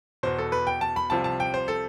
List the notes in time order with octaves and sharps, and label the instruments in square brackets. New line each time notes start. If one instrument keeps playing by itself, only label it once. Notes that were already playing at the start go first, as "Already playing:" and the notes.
[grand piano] E2 B2 C5
A4
B4
G5
A5
B5
C2 C3 F3 A5
A5
G5
C5
A4